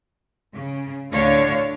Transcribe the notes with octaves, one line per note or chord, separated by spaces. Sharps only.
C#3
D2 A2 D3 D4 C#5 F5